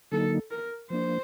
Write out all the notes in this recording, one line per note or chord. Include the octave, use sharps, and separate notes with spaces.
D3 F#3 A#3 D#4 A4
A#4
F3 A#3 D4 C5